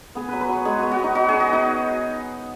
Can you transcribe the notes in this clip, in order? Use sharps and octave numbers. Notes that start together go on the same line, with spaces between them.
B3 G#4
F#3 B4
B4
F#3 C#5
G#3 G#4
B3 F#4
F#4
B3
D#4
D#4 F#4
D#4 G#4
F#4
B3 D#4